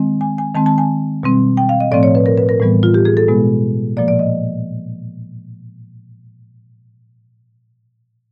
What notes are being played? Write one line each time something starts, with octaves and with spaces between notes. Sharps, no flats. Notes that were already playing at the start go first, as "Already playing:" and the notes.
Already playing: D#3 G#3 C4
G#5
G#5
D#3 G#3 C4 A5
A5
G#5
B2 G3 C4
G5
F5
D#5
A2 F3 A3 C4 D5
C#5
B4
A#4
B4
A#4
A2 E3 G3 B3
F4
G4
G#4
A4
B2 G#3 B3
A#2 F3 A#3 D5
D5
D#5